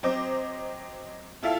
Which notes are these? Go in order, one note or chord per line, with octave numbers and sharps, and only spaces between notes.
F#3 C4 C5 D#5 D6
E4 F4 A4 E5 F5